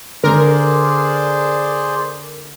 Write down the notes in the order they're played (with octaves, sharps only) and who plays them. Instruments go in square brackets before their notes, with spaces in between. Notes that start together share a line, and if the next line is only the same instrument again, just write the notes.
[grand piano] D3 [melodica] G#4 C5 D5 [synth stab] A#4